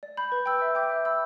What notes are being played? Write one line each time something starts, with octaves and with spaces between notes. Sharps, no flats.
D5
B5 G6
B4
G5 E6 G6
E5
G5 D6 G6
E5
B5 E6 G6